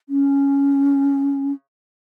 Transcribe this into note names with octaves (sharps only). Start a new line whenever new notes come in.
C#4